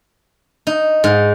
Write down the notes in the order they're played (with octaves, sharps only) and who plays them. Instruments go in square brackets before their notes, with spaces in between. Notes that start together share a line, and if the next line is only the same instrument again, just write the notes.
[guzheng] D#4
G#2